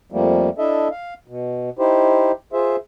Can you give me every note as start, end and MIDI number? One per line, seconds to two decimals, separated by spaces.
0.12 0.49 41
0.12 0.49 53
0.12 0.49 55
0.12 0.49 57
0.12 0.49 58
0.58 0.88 62
0.58 0.88 64
0.58 0.88 69
0.58 0.88 75
0.58 0.88 76
0.91 1.14 77
1.28 1.70 47
1.79 2.32 63
1.79 2.32 64
1.79 2.32 67
1.79 2.32 72
2.53 2.76 65
2.53 2.76 68
2.53 2.76 72
2.53 2.76 76